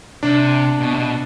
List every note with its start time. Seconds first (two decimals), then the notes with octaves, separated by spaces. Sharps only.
0.23 C3 D4
0.80 B2
0.94 C3
0.98 B2